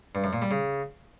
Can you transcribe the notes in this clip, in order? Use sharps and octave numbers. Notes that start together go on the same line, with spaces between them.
G2
F#2
A#2
G3
C#3